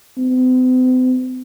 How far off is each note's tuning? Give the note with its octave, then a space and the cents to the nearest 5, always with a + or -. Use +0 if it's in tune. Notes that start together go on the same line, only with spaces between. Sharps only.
C4 -45